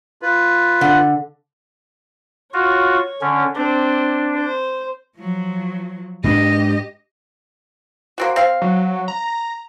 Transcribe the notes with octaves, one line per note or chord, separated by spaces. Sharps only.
F4 B4
D3
F4 F#4 C#5
D3 C#4
C4 D4
C5
F3 F#3
G#2 D4 G4 D#5
A#3 C4 F#4
C4 F5
F#3
A#5